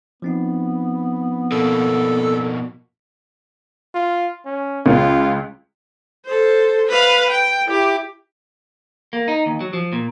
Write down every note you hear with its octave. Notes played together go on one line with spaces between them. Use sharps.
F3 B3 C4 D#4
B2 A#3 A4
F4
C#4
C#2 F4
A4 C5
B4 F5
G5
E4 G4
A#3
D#4
D#2
F#3
F3
A#2